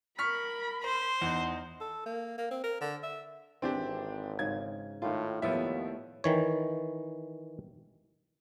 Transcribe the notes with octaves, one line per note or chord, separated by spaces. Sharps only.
A#4 B5 C#6 F6 B6
C5 C6
E2 D#4
A4
A#3
A#3
C4
A#4
D3
E5
G#1 E3 C4 D4 G4
G#2 C#3 G#6
A2 D#3 F4
D#2 A2 F3 A3 B3 D5 E5
D#3 E3 C#5